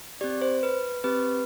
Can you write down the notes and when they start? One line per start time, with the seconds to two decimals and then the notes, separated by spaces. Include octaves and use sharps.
0.21 C4 G4 D5
0.42 C5
0.63 B4
1.04 C4 G4 B4